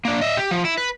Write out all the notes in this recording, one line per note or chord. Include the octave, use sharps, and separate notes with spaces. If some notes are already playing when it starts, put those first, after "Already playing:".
A#3 D4
D#5 E5
G4
F3
E4
B4